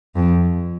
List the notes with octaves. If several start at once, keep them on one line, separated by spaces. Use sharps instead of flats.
F2